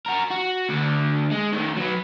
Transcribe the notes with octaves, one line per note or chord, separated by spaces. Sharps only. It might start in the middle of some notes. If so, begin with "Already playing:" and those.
F#4 A#4
F#4
D2 D3
G#3
D#3 A3
F#3 B3